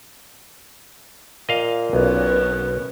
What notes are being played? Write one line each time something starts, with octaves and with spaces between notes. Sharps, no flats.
A#2 D#5 F5
B1 B3 C#4 A#4 B4